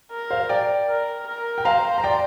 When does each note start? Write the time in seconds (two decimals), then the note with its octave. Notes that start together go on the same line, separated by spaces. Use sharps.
0.11 A#4
0.30 C5 F5
0.49 D5 G5
0.88 A#4
1.27 A#4
1.58 G5
1.65 C5 F5 A#5
1.98 A#5
2.04 D5 G5